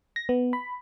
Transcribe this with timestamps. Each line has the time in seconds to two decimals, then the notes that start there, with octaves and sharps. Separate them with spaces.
0.16 A#6
0.29 B3
0.53 B5